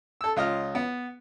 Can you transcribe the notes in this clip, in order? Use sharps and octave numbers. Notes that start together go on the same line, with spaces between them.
A4 E6
C#2 F4 D#5 F6
B3